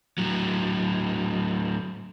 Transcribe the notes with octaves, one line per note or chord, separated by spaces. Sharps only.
A2 F#3